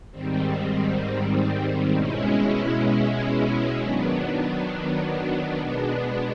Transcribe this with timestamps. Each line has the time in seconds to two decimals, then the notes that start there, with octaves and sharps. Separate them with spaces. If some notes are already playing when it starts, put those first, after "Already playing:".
0.11 G#2 D#3 G3 C4
1.94 B2 G#3 C#4 E4
3.76 D#3 F#3 B3 D4
5.57 B2 G#3 B3 D4